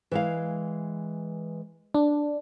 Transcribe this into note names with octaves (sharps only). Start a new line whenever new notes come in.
E3 G#3 F5
D4